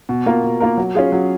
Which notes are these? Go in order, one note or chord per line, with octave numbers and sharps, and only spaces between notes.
B2
A#3 F4 A#4
B2
A#3 F4 A#4
F#3
C#4 F4 G#4
F#3